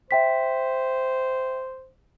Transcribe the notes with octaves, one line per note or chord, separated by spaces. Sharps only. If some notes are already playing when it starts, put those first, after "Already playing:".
C5 E5 G5 B6